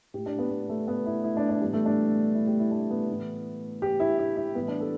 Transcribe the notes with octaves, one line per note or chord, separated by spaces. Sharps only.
A2 A3 G4
D4
B3
B3
A3
B3
E4
E4
D4
D4
A2 E3 G3 B3
A3
D4
E4
G4
E4
D4
B3
A2 E3 A3
G4
E4
E4
E4
A2 E3 G3 B3
D4
A4